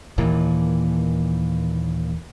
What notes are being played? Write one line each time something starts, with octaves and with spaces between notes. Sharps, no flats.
D#2 A#2 E3